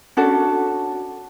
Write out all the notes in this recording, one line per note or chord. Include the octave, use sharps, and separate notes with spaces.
C#4 D4 F#4 A4